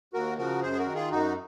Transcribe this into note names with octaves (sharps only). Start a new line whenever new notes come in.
D#2 F#4 A#4
C#3 F3 F#4 A#4
F#2 G#4 C5
G#4
F#4 A#4
D#3
F4 G#4
F#2 D#4 F#4